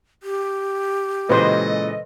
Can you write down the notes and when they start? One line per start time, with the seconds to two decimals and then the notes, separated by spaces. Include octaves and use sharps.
0.23 G4
1.30 A#2 C#3 E3 G#3 A4 B4 C5 D#5